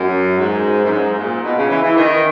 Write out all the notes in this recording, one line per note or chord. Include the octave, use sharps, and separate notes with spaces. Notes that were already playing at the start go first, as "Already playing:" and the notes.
Already playing: F#2
G#2
F#2
G#2
G#2
A#2
B2
C#3
E3
E3
D#3